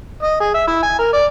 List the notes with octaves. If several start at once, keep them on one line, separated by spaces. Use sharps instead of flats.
D#5
G#4
E5
E4
G#5
A#4
D5